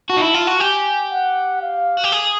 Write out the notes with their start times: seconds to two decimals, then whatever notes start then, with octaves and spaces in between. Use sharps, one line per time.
0.09 F#4 A5
0.17 D#4
0.21 E4
0.34 F4
0.47 F#4
0.60 G4 G#5
1.11 F#5
1.62 F5
1.97 F#4
2.04 G4
2.12 G#4